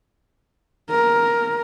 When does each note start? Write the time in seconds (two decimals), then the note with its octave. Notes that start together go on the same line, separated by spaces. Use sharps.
0.91 A#4